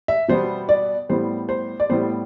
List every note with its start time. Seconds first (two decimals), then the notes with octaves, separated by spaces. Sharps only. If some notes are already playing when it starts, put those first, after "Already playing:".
0.08 E5
0.28 B2 G3 B3 C5
0.69 D5
1.09 A2 G3 B3 C5
1.49 C5
1.80 D5
1.89 A2 G3 B3 C5